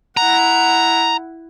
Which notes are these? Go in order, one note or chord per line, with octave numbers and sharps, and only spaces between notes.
E4 F#5 A#5